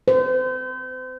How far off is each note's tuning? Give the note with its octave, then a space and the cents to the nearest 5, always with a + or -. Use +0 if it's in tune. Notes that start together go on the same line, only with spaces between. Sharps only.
C5 -35